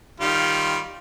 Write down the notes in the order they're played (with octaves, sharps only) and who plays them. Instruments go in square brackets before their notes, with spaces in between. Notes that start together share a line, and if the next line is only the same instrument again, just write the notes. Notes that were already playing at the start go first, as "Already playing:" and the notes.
[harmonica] D#3 G3 F4